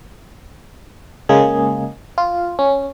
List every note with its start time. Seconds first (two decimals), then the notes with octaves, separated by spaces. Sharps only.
1.29 C#3 G#3 A#3 G#4
2.18 F4
2.59 C#4